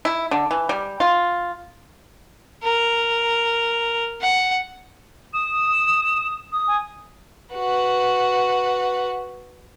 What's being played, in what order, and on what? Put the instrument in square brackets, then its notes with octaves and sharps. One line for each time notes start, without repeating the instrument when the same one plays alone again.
[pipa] E4
D3
E3
G3
F4
[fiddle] A#4
F#5
[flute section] D#6 [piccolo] E7
[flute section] D#6
[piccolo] G#5
[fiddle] F#4 B4